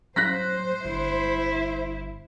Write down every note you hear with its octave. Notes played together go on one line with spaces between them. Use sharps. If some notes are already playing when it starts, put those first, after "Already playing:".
F#3 C5 F#6 A#6 B6
G1 E4